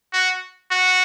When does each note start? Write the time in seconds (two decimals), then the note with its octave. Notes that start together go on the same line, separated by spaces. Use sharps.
0.13 F#4
0.71 F#4